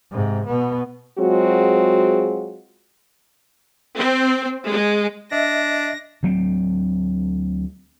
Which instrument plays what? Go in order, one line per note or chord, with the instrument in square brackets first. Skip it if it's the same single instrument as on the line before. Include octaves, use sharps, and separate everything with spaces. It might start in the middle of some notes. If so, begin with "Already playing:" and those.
[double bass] G#2 C3
B2 B3
[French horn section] F#3 G#3 C4 F4 F#4 G#4
[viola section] C4
G#3
[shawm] D4 [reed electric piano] D#5 E5 [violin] A#6
[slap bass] D2 F#3 A3 C4